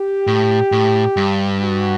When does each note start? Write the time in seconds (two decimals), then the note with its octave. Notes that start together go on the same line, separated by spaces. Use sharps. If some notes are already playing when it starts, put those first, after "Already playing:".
Already playing: G4
0.27 A2
0.72 A2
1.17 G2
1.61 F#4